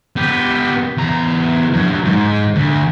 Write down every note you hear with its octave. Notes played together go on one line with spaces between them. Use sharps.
B3 G4
E2 A#5
G2 F#3
G#2
D2